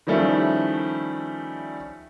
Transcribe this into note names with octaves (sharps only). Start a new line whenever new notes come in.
D#3 F3 G3 A3 C#4 E4